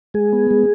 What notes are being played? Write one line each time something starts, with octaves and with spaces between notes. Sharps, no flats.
G#3 G#4
B3
G#3